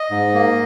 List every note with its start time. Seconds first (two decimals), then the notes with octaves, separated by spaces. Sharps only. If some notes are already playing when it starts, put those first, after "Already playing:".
Already playing: D#5
0.11 G#2
0.34 A#3